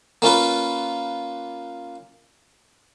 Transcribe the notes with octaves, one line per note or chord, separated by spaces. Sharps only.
A#3 C#4 F4 B4